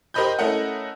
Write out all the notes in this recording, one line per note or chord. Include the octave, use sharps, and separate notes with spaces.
G4 A#4 C5 D#5 B5 G6
A3 C#4 E4 A#4 D#5 F#5